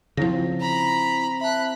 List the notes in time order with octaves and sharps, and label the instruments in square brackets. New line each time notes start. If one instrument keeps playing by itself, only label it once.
[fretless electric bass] C#3 F3 [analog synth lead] C4 [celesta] E4 A#6
[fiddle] A#5 B5
[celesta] E5 A5 [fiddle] B5 F#6